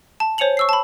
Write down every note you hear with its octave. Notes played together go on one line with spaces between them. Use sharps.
A5
C5 C#5 G#5 C#7 F7 F#7
C#6 E6 C7
A5 B5